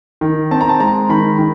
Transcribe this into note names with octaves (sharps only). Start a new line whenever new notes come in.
D#3
C4 A5
A#5
A5
G#3 A#5
D#3 B5
D#3